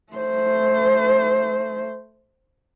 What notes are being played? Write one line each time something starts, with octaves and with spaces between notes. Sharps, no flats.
A3 C5